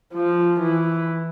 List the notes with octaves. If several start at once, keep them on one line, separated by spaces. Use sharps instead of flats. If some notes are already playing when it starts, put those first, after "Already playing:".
F3
E3